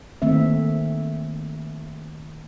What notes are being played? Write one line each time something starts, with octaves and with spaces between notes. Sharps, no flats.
D#3 A3 A#3 C4 E5